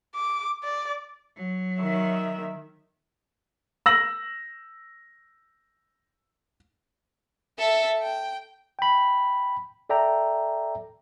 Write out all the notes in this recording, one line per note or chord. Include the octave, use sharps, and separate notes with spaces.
D6
D5
F#3
D#3 E5
E6 A#6 F#7
A4 E5
G5
G5 B5
A4 D5 E5 G5 A#5